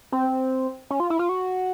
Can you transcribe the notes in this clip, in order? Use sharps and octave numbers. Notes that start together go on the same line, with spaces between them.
C4
C#4
F4
E4
F4
F#4